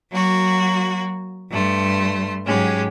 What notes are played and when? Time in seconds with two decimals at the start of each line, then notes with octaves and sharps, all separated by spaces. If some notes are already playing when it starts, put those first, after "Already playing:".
0.11 F#3 A#3 F#4
1.50 G2 A3 C6
2.46 G#2 F#3 G#3 C#4 G4